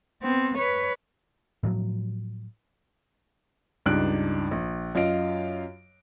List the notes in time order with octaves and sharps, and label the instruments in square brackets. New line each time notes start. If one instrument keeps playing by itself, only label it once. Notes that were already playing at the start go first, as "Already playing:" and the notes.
[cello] B3 C4
B4 C#5
[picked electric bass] A2 F3 F#3
[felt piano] C#2 G2 D4 D#4 F#6 D7
A#1
F#2 F4 D#5 F5 D7